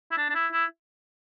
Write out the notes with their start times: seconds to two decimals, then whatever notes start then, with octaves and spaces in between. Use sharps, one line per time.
0.11 E4
0.17 D4
0.30 D4
0.35 E4
0.53 E4